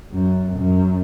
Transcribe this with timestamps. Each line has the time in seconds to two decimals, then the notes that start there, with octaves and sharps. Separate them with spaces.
0.13 F#2
0.57 F#2